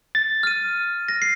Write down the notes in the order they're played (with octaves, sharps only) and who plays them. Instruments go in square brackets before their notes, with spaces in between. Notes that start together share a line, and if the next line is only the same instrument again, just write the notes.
[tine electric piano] A6
[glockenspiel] F6 D#7
A#6
C7